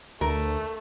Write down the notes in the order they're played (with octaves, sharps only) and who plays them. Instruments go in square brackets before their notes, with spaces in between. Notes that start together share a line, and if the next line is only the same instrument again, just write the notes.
[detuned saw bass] D2 [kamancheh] A3 [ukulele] A#4